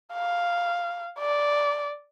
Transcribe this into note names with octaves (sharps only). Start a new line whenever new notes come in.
F5
D5